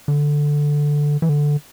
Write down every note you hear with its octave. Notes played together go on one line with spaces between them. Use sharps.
D3
E3
D3